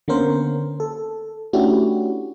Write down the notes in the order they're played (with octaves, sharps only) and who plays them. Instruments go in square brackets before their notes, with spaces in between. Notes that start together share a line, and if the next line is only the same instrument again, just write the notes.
[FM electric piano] D3 A#3 B3 C#4 A#4 C5
A4
A3 C#4 D4 E4 F#4 G4